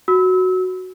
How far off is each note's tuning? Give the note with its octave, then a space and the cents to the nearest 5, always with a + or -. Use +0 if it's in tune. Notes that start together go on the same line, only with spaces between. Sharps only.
F#4 +0 E6 -30